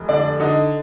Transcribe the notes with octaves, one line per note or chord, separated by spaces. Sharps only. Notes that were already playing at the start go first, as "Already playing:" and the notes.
Already playing: F1
D3 D4 D5
D3 D#4 D#5